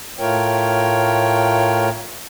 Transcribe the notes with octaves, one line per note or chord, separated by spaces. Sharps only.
A2 A3 F4 A#4 C#5 G5